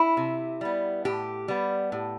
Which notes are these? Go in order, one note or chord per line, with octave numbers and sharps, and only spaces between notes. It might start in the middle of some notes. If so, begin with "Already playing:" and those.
Already playing: E4
C3
G3 B3
A2 G4
G3 B3
A2